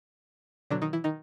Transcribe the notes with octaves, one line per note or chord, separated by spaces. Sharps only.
B2 D3 F#3 D4
D#3 D#4
E3 E4
D#3 D#4